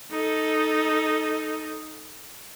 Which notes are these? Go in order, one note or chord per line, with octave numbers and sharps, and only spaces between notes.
D#4 A4